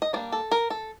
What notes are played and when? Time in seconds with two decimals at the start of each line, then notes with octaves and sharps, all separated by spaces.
0.02 D#5
0.13 G3 A#3 D4 D5
0.32 A4
0.52 A#4
0.70 A4